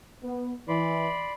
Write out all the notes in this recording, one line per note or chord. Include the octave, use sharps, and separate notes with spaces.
B3
E3 D5 B5 C6